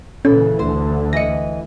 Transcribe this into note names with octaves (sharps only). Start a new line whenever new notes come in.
A#2 C#3 E3 C#4 A4
D2 D3 C5
E3 D#5 A#6 C#7